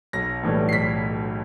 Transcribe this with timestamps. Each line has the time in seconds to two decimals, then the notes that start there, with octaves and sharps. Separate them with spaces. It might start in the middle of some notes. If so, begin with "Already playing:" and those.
0.13 B1 A#6
0.43 A2 E3 G3
0.69 C7
0.73 B1 B6